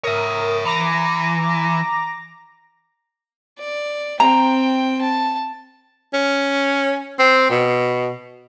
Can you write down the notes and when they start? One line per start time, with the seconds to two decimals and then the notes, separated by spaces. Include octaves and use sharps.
0.04 A#4 C#5 E5 D#6
0.65 E3 A#5 D6 A#6
3.59 D5
4.20 C4 G5 A#5
5.02 A5
6.14 C#4
7.19 C4
7.50 B2